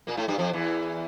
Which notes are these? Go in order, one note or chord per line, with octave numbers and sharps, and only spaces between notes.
A#2 A#3
A2 A3
G2 G3
F2 F3
E2 E3